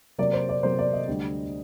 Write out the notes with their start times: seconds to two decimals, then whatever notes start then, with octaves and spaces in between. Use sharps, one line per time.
0.18 C3 F#3 A#3 D5
0.33 C5
0.49 D5
0.63 C3 F#3 A#3 C5
0.79 D5
0.93 D#5
1.07 D2 D3 G3 D4